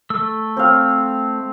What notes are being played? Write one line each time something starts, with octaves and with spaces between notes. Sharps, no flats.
A3 E6
C4 F5